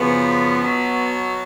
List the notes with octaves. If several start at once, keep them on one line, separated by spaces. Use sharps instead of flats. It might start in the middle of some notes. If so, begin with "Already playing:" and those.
Already playing: F#2 C#3 F3 B3
B2 F#3